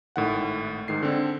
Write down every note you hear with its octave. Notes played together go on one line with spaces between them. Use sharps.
G#1 A2 D#3 F#5
G#2 D#3 C7
D3 C4 D4